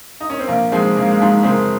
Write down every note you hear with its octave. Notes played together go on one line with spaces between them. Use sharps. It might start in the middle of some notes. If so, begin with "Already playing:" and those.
D#4
C#4
C4
A#1 A#3
G#2 F3 G#3 C4
A#1 A#3
G#3
A#3
G#2 F3
F#1 G#3 C4